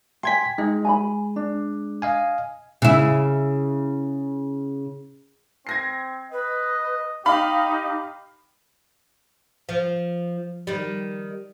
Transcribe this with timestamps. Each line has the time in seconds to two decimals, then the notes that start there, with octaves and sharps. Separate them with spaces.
0.23 G5 G#5 C6 G#6 B6
0.58 G#3 D#4
0.85 G#5 A#5 B5
1.36 D4
2.02 D#5 F5 G#5
2.82 C#3 E4
5.67 C4 G#6 A#6 C7
6.32 B4 D#5
7.26 D#4 G4 F5 B5
9.69 F3
10.67 D#3 G3